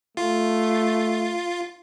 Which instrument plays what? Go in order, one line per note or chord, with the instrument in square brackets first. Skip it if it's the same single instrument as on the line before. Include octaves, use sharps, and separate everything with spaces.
[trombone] A3 [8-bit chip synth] F4